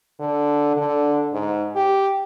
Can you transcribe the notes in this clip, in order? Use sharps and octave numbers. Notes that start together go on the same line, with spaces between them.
D3
D3
G#2
G4